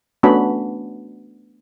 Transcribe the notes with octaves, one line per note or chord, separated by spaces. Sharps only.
A3 B3 C#4 D4 F#4 B5